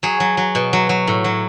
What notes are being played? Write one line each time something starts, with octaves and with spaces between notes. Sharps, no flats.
F#3 G#4
F#3
F#3
B2
F#3
F#3
A2
F#3